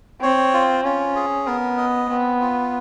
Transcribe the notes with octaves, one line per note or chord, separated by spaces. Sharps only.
C4 C#5
F4
C#4 F4
G#4
B3 A#4
D#5
B3 C4
F4